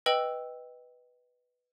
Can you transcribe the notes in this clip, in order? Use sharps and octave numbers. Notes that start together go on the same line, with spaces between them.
B4 D#5 G5 E6 F#7